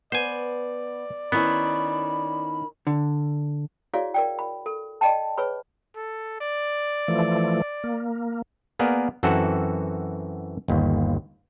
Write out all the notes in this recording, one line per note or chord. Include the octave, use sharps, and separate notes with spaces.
B3 C5 D5 G#5
D#3 B3 C#4 E4 B5
D3
E4 F#4 G#4 C#5 D5 F5
A#4 D5 G5
B5
A4
D5 D#5 G5 A5
G#4 B4 C#5 B5
A4
D5
E3 F3 A3
A#3
A#3 B3 G#4 A#4 D5
F#2 E3 C4 F#4 A4 F#5
G1 D#2